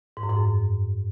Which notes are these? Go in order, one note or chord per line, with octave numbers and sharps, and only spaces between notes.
G#2
F#2
G#2
F#2